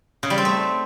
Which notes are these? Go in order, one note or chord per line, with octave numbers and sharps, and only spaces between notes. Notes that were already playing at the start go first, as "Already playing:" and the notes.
C#3
G3
C4
A3